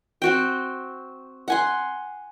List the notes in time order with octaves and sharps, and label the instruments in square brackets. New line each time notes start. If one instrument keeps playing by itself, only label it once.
[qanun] C4 F#4 G5
F#5 G#5 C6